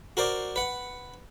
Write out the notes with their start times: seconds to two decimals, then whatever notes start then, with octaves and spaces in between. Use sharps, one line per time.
0.17 F#4 A#4 C5 D5
0.56 B4 F#5